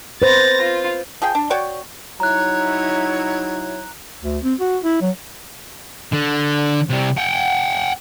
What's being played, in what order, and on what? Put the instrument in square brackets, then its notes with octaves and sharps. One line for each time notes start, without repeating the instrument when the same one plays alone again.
[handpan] B4 C5 [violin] A6 A#6
[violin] F4
[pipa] F3 G#4 G5
D4
F#4 C#5 D5 G5
[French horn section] F#3 D#4 E4 [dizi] C#5 [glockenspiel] A#5 F#6
[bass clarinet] D2
C4
F#4
E4
F#3
[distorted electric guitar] D3
C3 G3
F#5 G5